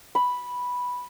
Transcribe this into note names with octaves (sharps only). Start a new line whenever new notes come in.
B5